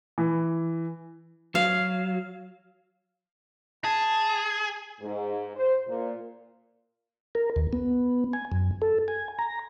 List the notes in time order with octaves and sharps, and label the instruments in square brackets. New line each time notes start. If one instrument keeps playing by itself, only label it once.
[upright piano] E3
[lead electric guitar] F#3 [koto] F5
[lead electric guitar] G#4 [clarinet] A5
[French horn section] G#2
C5
A#2
[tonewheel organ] A#4
D#2
B3
G#5
F#2
A4
G#5
A#5